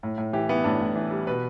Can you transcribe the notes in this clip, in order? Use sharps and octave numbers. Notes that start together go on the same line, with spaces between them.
A2
A2
E3 G4
E3 B3
A2 D4
A2
E3
G3
B2 B4